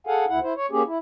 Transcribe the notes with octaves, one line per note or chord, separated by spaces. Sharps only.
G#4 A4 F5 F#5 G#5
D2 E4 F#5
E4 C5
C#5
A#3 C#4 G4 G#4
E4